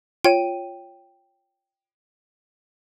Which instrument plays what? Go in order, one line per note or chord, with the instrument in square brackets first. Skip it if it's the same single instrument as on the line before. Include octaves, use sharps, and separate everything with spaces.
[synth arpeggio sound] F4 C#5 D#7 [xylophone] G5